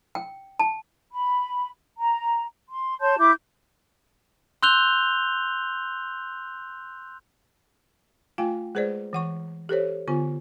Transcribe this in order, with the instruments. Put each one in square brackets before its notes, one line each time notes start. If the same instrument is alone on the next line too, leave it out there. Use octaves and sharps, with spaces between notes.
[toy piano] G5
A5
[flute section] B5
A#5
C6
C#5 A5 C6 G6
E4 D6 G6
[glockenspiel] C6 E6 F#6 G6 F7 G7
[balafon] A3 F4 F5 G5 G#5
G#3 G#4 B4 C5 D5
E3 F#5 C#6
G4 A4 C5 C#5
D3 B3 F4 G#5